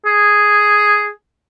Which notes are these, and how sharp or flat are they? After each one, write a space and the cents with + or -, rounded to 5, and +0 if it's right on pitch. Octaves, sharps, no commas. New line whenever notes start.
G#4 +0